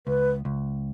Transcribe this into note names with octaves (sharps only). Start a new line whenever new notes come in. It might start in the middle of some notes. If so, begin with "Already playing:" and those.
C#2 B4
C#2